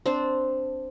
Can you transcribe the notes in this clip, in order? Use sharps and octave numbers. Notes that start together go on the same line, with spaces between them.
C4 D4 C5